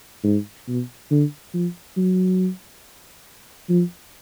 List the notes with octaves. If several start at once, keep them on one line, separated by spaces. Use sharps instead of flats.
G#2
B2
D3
F3
F#3
F3